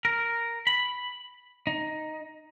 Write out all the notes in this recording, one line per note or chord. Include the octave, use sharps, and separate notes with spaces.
A#4
B5
D#4